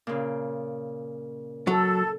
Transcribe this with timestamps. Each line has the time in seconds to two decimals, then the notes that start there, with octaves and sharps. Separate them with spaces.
0.07 A#2 C#3
1.67 F#3 A4